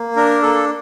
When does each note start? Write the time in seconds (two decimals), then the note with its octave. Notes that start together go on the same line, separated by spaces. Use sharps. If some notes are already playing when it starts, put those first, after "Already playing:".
Already playing: A#3
0.16 D4 A#4
0.42 A#3 A4